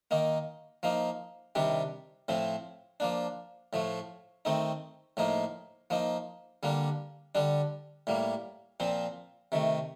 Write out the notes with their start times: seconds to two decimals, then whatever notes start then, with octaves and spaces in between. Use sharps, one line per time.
0.11 D#3 A#3 D#4
0.83 F3 A#3 D#4
1.55 C3 D#3 G3 D4
2.28 A2 F3 C4
3.00 F3 A#3 D4
3.73 A2 F3 A3
4.45 D#3 A3 C4 D#4
5.17 A2 F3 A#3 D#4
5.90 F3 A#3 D#4
6.63 D3 G3 A#3 D4
7.35 D3 G3 D4
8.07 A2 G3 A#3
8.80 A#2 F3 C4
9.52 C3 D#3 A3